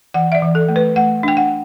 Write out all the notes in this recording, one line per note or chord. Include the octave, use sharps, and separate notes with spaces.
E3 F#5
E5
D5
E3
A4
A3
B4
A3 F#5
D4 G5
F#5